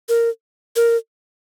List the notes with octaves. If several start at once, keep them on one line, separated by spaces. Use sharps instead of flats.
A#4
A#4